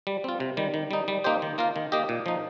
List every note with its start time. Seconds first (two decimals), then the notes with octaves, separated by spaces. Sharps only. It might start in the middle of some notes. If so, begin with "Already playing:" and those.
0.07 G3
0.24 C4 F4
0.40 C3
0.57 D#3 G3
0.74 D#3
0.91 G3 D#4
1.08 G3
1.24 A#3 D#4 G4 C5
1.42 D#3
1.58 A#3 F4 A#4 F5
1.76 D#3
1.92 A#3 D#4 G4 D#5
2.09 A#2
2.26 F3 D#4